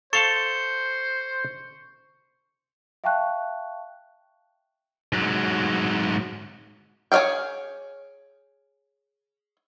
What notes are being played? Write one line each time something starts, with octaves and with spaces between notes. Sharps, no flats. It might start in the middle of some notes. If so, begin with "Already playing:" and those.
A4 C5 F5 A5 C#6 C#7 G7
E5 F5 G5 A5 C#6 F#6
G#2 F#3
G#4 C#5 D#5 F5 G5